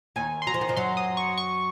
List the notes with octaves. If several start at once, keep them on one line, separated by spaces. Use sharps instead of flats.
D#2 D#3 G#5
C6
F#3 A#5
F3
D#3
F2 F3
F#2 F#3 C6
D#6
C#6
C#6